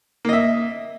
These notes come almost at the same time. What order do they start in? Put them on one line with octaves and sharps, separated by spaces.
A#3 D#5 E5